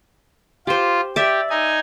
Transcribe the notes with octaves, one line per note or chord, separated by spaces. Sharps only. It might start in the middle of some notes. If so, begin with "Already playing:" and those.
F4 G4 C5
G4 D5 E5
D#4 G#5